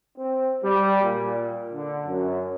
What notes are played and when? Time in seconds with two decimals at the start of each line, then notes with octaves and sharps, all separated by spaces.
0.17 C4
0.63 G3
1.02 A#2
1.74 D3
2.06 F#2